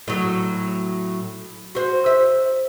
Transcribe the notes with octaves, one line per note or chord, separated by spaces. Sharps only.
A2 F#3
F#4 C5
E5